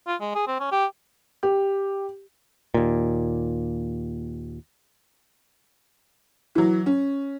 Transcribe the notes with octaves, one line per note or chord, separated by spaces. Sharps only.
F4
G#3
G#4
C4
C#4
G4
G4
D#2 A#2
E3 F#3
C#4